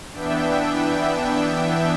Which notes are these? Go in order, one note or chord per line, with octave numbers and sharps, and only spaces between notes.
E3 B3 D4 E5 G5